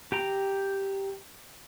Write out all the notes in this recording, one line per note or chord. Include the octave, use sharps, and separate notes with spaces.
G4 G5 A#5